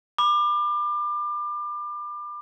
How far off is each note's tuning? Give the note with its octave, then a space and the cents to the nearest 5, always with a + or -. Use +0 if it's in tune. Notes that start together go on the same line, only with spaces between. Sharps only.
B5 +0 D6 +30